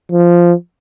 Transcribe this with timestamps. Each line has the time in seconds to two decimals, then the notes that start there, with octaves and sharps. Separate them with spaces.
0.12 F3